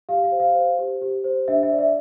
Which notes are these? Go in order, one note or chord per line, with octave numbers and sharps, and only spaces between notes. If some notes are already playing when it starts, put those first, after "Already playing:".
G4 F5
F5
C5
F5
C5
G4
G4
C5
D4 E5
E5
D5
E5